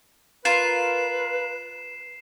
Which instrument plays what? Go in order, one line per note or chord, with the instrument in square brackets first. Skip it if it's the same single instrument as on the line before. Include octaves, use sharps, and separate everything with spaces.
[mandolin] F4 A#4 [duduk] B4 [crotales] C7 E7